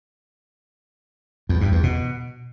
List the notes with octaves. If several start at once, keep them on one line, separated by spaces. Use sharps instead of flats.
E2
G2
E2
B2